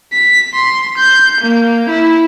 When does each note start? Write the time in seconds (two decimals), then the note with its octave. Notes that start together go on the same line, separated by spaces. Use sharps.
0.13 B6
0.54 C6
0.98 G6
1.42 A#3
1.90 E4